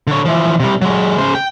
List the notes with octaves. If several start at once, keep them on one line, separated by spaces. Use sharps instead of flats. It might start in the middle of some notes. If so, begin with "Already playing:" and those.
D3 C#5
E3 F3
C3 G3
F#3 G#3
C#3 C5
G5